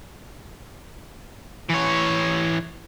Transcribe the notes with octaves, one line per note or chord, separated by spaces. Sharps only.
E3 C#5